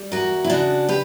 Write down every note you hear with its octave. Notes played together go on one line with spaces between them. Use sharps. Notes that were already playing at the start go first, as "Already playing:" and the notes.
Already playing: G3
E2 F#4 A#4
E4
C#3 D4 F#4
G4 B4